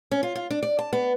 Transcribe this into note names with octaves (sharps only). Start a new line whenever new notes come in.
C#4
F4
F4
D4
D5
A5
B3